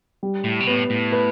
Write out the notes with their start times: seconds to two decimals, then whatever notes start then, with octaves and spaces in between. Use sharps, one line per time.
0.23 G3
0.44 A2
0.60 B2
0.67 A2 B3
0.90 A2
1.12 B4